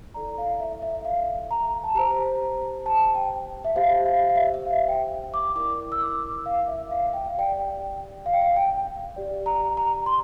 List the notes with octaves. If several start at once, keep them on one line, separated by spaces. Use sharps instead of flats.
E4 A4 D5 A#5
F5
E5
E5
F5
A#5
A5
G4 C5 A#5
A5
G5
E5
G4 C5 F5
F5
F5
E5
E5
F5
G5
D6
E4 A#4 D5 D6
E6
D6
F5
E5
F5
G5
F5
G4 D5 G5
F5
G5
F5
G5
G4 D5
A#5
A#5
C6